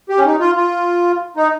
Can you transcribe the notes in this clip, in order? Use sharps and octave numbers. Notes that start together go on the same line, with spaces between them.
G4
C#4
D#4
F4
F4
D#4